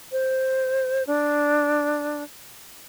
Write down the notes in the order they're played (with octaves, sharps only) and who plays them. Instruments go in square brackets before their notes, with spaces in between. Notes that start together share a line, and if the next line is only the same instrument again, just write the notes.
[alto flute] C5
D4